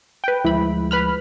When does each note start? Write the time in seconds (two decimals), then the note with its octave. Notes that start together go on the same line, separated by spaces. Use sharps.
0.24 B4 G5
0.45 D2 F3 G#3 E4 B5
0.91 B4 B5 F6